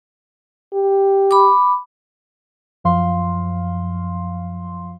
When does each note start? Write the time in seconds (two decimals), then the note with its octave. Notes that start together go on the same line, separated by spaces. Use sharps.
0.73 G4
1.31 B5 D6
2.84 F#2 F3 F5 C6